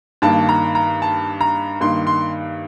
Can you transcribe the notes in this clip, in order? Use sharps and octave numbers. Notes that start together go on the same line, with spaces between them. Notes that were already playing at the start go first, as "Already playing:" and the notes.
G2 D#3 A#3 A5
A#5
A#5
A5
A#5
G2 D#3 A#3 C6
C6